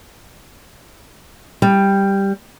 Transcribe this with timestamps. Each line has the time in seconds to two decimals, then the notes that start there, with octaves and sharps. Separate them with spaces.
1.62 G3